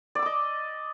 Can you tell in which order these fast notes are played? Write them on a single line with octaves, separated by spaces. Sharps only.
D5 E6 D6 D#5